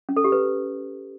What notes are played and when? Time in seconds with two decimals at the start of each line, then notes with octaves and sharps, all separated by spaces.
0.09 C#4
0.17 A4
0.24 G4
0.32 B4